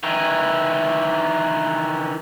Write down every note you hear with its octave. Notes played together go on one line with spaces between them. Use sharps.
D#3 E3